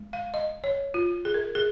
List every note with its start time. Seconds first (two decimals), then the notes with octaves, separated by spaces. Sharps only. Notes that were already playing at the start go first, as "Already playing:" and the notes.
Already playing: G#3
0.13 F5
0.34 D#5
0.64 C#5
0.94 F4
1.25 G#4
1.34 A#4
1.55 G#4